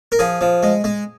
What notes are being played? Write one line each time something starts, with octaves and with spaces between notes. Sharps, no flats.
A#4
F3 G#4
F3
G#3
G#3